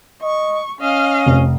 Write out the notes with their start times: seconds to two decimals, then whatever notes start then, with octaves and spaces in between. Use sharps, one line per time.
0.22 D#5 C#6
0.81 C#4 D#5 F5
1.26 F1